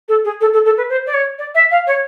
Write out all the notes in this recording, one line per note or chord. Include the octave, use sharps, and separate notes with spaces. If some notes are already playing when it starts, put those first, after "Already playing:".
A4
G#4
A4
A4
A4
B4
C5
D5
C#5
D5
E5
F5
C#5